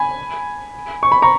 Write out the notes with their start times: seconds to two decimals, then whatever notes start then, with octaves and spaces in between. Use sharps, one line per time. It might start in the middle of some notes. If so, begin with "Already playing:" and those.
Already playing: G#5 B5
1.03 C#6
1.12 B5
1.22 A#5 C#6